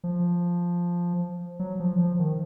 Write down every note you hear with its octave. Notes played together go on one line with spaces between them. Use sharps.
F3
F#3
F3
F3
D#3